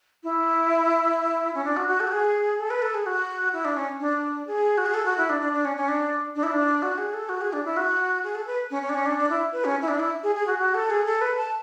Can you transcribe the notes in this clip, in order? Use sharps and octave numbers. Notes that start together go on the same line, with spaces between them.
E4
C#4
D4
F#4
F#4
A4
F#4
G#4
A4
B4
A4
G#4
F#4
E4
D4
C#4
D4
G#4
F#4
G#4
A4
F#4
E4
D4
D4
D4
C#4
C#4
D4
D4
E4
D4
F#4
G#4
A4
F#4
G#4
D4
E4
F#4
G#4
A4
B4
C#4
C#4
D4
C#4
D4
D4
E4
B4
C#4
E4
D4
E4
G#4
G#4
F#4
F#4
A4
G#4
A4
B4
A5